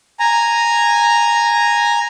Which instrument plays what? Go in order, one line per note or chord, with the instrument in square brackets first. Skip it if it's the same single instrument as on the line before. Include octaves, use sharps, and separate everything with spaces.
[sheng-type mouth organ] G#5 A#5